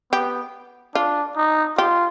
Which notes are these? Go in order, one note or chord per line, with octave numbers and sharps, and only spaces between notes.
B3 G4
D4 F4
D#4
F4 G4